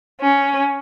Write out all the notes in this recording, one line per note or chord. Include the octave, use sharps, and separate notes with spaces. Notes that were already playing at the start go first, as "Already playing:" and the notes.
C#4